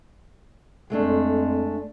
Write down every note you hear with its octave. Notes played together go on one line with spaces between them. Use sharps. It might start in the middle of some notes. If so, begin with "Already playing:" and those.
F2 G#3 A3 D4